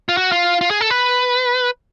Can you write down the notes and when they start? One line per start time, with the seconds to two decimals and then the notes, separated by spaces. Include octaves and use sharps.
0.09 F4
0.17 F#4
0.32 F4
0.61 F4
0.71 G#4
0.81 A4
0.90 B4